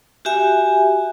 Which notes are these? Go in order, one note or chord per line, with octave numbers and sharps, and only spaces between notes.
F#4 G4 E5 G#5